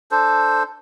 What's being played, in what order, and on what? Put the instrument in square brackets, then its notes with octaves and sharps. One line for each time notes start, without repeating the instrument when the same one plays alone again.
[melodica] D4 A4 C5